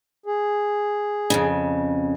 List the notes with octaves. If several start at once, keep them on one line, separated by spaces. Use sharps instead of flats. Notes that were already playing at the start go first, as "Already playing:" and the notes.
G#4
F2 A2 C#3